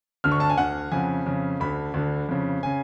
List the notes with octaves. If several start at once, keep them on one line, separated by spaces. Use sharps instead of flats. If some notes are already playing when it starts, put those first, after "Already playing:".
D2 D3 F6
C#6
A5
G#5
D2 D3 F#5
F2 C#3 G#5
F2 C#3
D2 D3 B5
D2 D3
F2 C#3
C#3 G#5